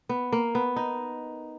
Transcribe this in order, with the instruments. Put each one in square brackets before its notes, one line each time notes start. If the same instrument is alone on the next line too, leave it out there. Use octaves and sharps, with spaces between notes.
[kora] B3
A#3
B3
D#4